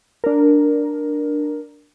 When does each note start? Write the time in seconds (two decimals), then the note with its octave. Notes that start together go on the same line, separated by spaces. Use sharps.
0.24 D4 A#4